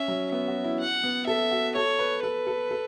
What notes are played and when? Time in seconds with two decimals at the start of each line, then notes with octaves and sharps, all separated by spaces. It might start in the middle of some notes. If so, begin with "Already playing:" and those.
Already playing: C#4 E5
0.08 F#3
0.32 B3 E5
0.48 F#4
0.64 E4
0.80 F#5
1.03 B3
1.27 A4 E5
1.51 F#4
1.76 A4 C#5
1.99 B4
2.22 A4 B4
2.47 A4
2.71 A4